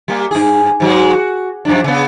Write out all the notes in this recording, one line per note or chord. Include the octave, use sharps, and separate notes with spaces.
G3 A#3
G2 G#4
G#2 F#3 G#3
F#4
F#2 F3 D4
C#3 B3